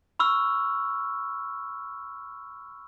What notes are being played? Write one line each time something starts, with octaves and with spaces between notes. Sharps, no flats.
B5 C#6 E6 F6